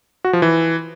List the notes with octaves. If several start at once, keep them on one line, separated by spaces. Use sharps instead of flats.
F#4
F3
E3